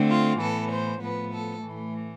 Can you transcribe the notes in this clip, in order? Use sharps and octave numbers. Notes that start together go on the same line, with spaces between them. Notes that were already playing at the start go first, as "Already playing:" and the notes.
Already playing: D3 A3 C4
F4
A2 E3 B3 A4
C5
A2 F3 B3 B4
A4
A2 E3 A3